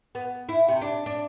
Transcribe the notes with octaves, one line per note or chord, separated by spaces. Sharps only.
B3
E4
C3
D4
D4